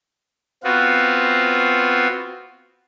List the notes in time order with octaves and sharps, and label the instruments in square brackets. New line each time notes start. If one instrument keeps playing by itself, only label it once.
[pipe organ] B3 C4 F4 F#4